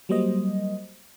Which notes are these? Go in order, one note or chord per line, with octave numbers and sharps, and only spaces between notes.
F#3 G3 A#3 C5 D#5